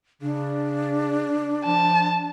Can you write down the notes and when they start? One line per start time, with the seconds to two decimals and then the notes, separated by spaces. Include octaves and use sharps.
0.22 C#3 D4
1.65 F3 A5